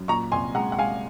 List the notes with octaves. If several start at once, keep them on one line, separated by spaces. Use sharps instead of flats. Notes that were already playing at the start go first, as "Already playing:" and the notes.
Already playing: F#2
A#2 A#5 C#6
C2 G#5 C6
G#3 F#5 A#5
F#5
G#3 F5 G#5